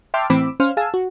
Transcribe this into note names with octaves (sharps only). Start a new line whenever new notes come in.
E5 G5 A5 C6 D6 F6
A2 E3 C4 B5 D6 E6
C#4 C5 F5 F6
G#4 F5 G#5 A5 E6
F#4